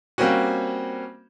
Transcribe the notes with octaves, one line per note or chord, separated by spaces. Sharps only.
G3 A#3 C4 C#4 F#4